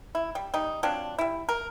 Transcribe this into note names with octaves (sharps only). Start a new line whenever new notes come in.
E4
G3
G3 D#4
F3 F#3 C4 D4
G3 E4
A#4